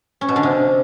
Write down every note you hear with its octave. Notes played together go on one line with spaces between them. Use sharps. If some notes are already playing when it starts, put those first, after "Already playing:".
C#4
B2
D3
C3